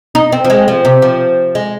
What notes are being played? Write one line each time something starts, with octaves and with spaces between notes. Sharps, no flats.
D#4
C4
F3
G#3
F3
C3
F3
G#3